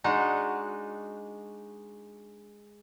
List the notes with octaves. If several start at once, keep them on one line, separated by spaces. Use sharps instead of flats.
G#3 D4 D#4 F#4